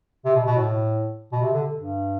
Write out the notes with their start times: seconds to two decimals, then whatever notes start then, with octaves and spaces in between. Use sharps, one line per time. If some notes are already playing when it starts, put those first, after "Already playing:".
0.25 C3
0.36 B2
0.46 B2
0.57 A2
1.32 B2
1.42 C3
1.54 D3
1.76 G2